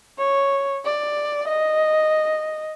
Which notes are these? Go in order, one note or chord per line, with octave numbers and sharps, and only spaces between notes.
C#5
D5
D#5